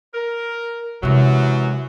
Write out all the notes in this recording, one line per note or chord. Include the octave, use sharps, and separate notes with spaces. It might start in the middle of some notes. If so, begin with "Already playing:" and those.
A#4
F#2 C3 E3 F#3 G#3